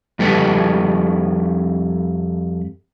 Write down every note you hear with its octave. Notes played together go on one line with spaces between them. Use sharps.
F2 G3 A4 B4